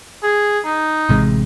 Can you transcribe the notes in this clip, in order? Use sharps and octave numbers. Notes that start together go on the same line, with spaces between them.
G#4
D#4
A1 C3 G#3